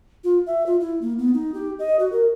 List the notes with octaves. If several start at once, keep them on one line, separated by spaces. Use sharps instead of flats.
F4
E5
F4
E4
A#3
B3
D#4
G4
D#5
F#4
A#4